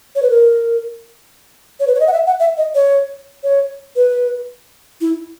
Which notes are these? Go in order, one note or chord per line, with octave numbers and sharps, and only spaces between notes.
C#5
B4
A#4
C#5
B4
C#5
D#5
F#5
E5
F#5
E5
D#5
C#5
C#5
B4
E4